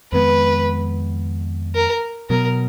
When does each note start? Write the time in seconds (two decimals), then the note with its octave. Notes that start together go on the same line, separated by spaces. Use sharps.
0.12 F2 D#3 G#3 B3 B4
1.75 A#4
2.30 B2 F#3 B3 A#4